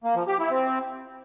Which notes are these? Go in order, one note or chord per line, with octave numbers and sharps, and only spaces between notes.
A#3
F3
G4
E4
C4